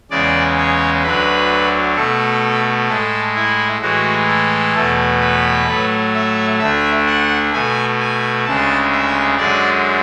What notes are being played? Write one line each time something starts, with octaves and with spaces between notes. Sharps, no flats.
E2 C#3 G#3 D5
C#5
D2 D3 F#3 B4
B2 A3 A4
A2 G#3 A4
E4
A2 E3 G#3 F#4
A4
E2 B2 A3
B4
A2 F#3 A3
E5
D2 D3 A3 E5
F#5
B2 A3 G#5
G#5
D2 C#3 G#3 A5
E5
F#2 D3 G#3 D5